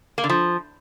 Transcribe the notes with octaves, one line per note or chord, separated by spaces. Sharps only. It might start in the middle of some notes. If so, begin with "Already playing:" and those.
A#3
D3
F3